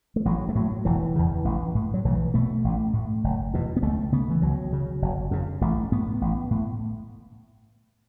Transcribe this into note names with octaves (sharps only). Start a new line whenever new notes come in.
A3
A1 F#3
A3
A2 F#3
E1 E3
E2 C#3
A1
A2
F#3
B1 E3
B2 A3
A1
A2
F#1
E2 B2
B3
C#2 A3
C#3 B3
E3
C#2 F#3
C#3
F#1
F#2 C#3
A1 A3
A2 B3
A1
A2